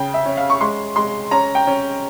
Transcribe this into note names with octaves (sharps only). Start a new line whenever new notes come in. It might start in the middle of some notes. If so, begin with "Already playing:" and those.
Already playing: C#3 G5
E5
C#4
F5
C#6
G#3 C6
G#3 C6
C#4 A#5
G5
C#4